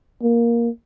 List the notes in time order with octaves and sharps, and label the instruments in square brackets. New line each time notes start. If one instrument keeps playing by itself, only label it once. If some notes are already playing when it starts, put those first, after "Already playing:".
[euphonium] A#3